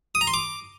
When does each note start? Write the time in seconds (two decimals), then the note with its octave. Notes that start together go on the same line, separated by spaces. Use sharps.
0.15 D#6
0.21 A#5
0.27 C6
0.34 D6